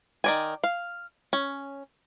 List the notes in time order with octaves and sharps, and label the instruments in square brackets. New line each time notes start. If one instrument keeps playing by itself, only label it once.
[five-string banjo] D#3 D5 G#5
F5
C#4